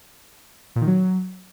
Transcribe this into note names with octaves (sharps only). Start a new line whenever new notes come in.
A#2
D#3
F#3